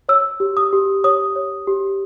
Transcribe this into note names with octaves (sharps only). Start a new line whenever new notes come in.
C#5 E6
G4
D#6
G4
C#5 D#6
C#5
G4